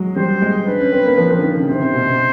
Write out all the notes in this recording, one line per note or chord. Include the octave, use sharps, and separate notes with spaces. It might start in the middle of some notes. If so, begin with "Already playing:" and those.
Already playing: F#3 G#3
G3 C5
G#3
D4 B4
C#4
C4
A#3
F3
F3
D3
D#3
C#3
C3 C5
C3
B2
C3